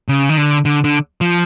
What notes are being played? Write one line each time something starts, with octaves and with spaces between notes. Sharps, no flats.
C#3
D#3
D3
D3
D3
F3